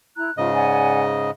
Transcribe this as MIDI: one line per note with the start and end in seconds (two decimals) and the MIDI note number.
0.17 0.31 64
0.17 0.31 82
0.17 0.31 90
0.38 1.31 44
0.38 1.31 49
0.38 0.49 65
0.38 1.31 75
0.55 1.03 74
0.55 1.03 78
0.55 1.03 80